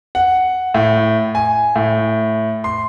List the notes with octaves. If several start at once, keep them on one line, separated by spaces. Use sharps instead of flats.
F#5
A2
G#5
A2
C6